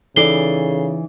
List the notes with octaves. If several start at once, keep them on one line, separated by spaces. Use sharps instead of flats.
C#3 E3 D#4 A4 D5 C7 G7